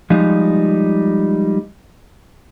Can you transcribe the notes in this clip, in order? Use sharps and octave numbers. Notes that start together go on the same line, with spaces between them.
F3 G3 G#3 D#4